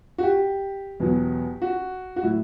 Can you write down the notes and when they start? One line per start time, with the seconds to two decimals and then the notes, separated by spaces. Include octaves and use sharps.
0.18 F#4
0.23 G4
1.00 E2 B2 F#3
1.62 F#4
2.16 F#4
2.23 A2 F#3 E4